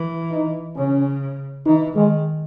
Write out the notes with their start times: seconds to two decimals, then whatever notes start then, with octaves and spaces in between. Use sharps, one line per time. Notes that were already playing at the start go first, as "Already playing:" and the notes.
Already playing: E3
0.31 D#4
0.75 C#3 C#4
1.65 E3 D#4
1.95 D#3 G#3